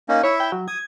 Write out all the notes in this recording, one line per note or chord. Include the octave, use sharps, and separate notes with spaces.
A#3 C#4 D#4
E4 C#5 E5
G5
F#3
D#6 G#6